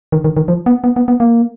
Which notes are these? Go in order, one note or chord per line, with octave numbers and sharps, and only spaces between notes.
D#3
D#3
D#3
F3
B3
B3
B3
B3
A#3